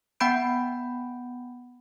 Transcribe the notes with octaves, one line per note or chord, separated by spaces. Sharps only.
B3 F#5 G5 B5 G6 D7